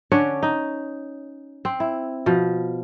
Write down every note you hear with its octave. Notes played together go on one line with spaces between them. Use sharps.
D3 C#4 D4 C#5
D#4
C4
E4
B2 F3